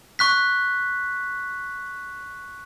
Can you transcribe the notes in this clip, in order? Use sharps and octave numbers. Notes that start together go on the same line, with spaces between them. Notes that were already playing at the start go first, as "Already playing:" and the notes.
C#6 F#6 B6